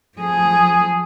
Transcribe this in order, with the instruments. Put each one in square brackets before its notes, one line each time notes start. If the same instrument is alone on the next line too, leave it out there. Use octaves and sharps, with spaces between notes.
[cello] F3 G#4